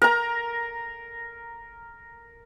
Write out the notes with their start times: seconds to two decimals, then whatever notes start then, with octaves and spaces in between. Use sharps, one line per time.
0.02 A#4 A#5